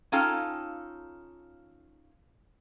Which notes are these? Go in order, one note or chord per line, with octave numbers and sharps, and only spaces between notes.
C#4 D#4 F4 A4 F5 G5